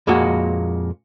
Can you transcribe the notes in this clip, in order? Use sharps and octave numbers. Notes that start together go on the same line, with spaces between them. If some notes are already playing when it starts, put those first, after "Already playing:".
F2 A#2 G#3 A#3 F#4